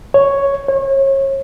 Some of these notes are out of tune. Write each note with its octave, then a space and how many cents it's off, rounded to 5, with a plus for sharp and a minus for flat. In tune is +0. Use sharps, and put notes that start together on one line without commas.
C#5 +0
C#5 -35